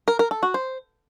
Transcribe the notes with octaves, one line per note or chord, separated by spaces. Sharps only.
A#4
A#4
A4
F#4
C5